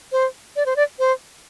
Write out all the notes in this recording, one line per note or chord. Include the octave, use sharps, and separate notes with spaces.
C5
D5
C5
D5
C5